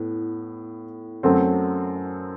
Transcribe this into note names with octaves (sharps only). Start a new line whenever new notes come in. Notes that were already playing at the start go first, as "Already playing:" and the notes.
Already playing: A2 B3
F#2 F#3 A3 C4